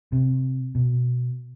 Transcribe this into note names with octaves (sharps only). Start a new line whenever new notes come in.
C3
B2